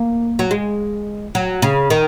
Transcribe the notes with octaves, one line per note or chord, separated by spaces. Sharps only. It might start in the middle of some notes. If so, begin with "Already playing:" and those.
Already playing: A#3
F#3
G#3
F#3
C#3
D#3